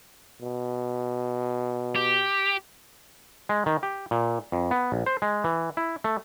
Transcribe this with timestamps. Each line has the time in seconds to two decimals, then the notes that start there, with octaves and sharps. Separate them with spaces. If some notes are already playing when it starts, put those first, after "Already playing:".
0.42 B2
1.96 G4
3.49 G#3
3.66 D#3
3.83 G4
4.11 A#2
4.52 F2
4.71 B3
4.92 A#1
5.06 C5
5.22 G#3
5.44 E3
5.77 E4
6.04 A3